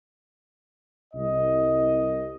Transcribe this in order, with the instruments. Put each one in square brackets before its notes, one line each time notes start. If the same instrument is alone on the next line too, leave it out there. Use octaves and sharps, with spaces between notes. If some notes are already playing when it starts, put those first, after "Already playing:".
[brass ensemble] C2 D#5